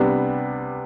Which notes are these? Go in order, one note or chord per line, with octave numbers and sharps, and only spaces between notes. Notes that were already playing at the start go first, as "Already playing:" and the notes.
Already playing: C3 G3 B3 D4